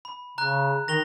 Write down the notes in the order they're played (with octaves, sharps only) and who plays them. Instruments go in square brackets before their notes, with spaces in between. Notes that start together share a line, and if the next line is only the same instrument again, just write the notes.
[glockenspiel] B5
[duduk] C#3 [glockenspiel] A#5 F#6
[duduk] D#3 [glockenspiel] A#6 F7 G7